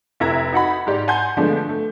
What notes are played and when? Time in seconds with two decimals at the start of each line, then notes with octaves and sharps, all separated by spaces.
0.20 F1 E4 E5 A#5 G#6
0.53 D#4 F#4 F#5 B5
0.87 G#2 G4 D5
1.08 F#5 G#5 A5 C6 G6
1.37 D3 F3 G#3 A3 B3 D4
1.69 A3